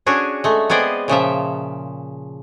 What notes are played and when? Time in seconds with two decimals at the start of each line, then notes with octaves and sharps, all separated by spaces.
0.06 C#4 D4 F#4 G#4
0.44 G#3 A3
0.70 B3 C4 G#4 D5 D#5
1.08 A#2 C#3 F3 E5